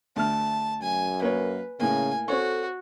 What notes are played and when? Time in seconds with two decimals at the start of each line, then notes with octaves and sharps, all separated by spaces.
0.16 D2 A3 A5 F6
0.82 F#2 G#5
1.22 A#3 B4 C#5
1.80 A2 C#3 A#3 G#5
2.28 C4 F#4 A4 C#5 C#6